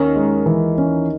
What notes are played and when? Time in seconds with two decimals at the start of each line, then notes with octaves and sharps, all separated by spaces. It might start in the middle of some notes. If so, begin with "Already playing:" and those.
Already playing: D#2 D#3 C#4
0.16 G#3
0.46 E3
0.78 C#4